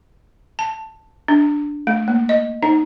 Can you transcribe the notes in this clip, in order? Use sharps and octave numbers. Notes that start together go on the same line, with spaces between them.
A5
D4
A3
A#3
D#5
D#4